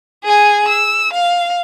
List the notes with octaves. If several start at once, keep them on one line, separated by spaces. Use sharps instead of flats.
G#4 G#5
E6
F5